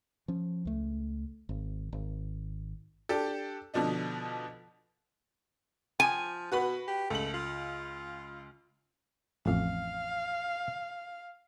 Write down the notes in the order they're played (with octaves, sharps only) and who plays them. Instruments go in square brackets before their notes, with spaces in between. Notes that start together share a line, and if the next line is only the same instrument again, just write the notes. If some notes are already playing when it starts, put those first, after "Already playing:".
[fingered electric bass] F3 C#4
C#2 A3
G#1
G#1
[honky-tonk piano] D4 G4 A4
B2 D3 F3 D4 D#4
[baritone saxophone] F3 [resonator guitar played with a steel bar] G#5
[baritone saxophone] B2 [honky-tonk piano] F#4 B4 B5
[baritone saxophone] G4
[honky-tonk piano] C#2 F#7 [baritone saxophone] A3
[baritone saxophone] F4
[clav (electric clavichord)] A1 F2 [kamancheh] F5